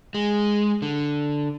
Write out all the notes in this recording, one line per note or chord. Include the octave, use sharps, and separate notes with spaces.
G#3
D3